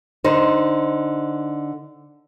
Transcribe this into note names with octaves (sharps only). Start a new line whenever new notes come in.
D3 D#4 C5